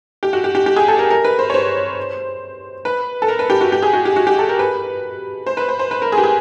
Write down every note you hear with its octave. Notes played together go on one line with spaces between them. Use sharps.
G4
F#4
G4
G4
G4
G#4
A4
A#4
A#4
B4
C5
C#5
C5
B4
A4
A#4
B4
G4
F#4
G4
G#4
F#4
G4
F#4
G4
A4
A#4
B4
C5
B4
C5
C5
B4
A#4
G#4
G4
G#4